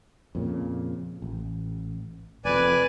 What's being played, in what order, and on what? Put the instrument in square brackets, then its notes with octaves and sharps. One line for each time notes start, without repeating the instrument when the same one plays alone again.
[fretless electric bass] F2 A#2 C#3
A1
[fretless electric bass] F1 F2 [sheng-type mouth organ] B4 D5 G#5